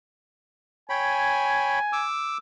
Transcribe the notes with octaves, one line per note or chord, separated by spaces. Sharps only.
C#5 G5 G#5 B5
D6 E6